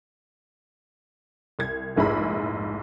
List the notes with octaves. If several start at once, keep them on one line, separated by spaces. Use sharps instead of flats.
C2 G#6
F1 A#1 G#2 E4 G#4 B5